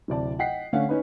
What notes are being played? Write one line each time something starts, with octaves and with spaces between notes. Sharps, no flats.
D1 C3 D5 A5
D#5 F#5 G5 B6 C7
D3 A3 C#4 F5 F#5
C#4 D#4 B4